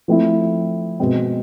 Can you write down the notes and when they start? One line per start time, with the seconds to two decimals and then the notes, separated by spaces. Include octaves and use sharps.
0.08 F3 A3 C4 E4
1.00 B2 G#3 C4